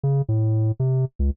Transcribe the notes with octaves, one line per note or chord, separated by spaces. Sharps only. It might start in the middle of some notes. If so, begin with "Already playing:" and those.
C#3
A2
C3
C#2